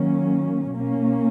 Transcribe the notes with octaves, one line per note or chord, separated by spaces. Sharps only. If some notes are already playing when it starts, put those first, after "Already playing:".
Already playing: D#3 F#3 A#3 C#4
B2 A#3 C#4